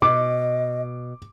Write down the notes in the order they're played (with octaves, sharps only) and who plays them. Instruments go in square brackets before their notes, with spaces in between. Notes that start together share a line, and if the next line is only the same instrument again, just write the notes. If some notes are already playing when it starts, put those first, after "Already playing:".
[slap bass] B2 [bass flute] D#5 [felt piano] D6